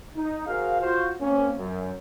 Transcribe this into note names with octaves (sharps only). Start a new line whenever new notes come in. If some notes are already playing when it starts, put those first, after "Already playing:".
D#4
F#4 G#4 A#4 C5 F5
F4 F#4 C5 F5
A#3 C4 C#4
F#2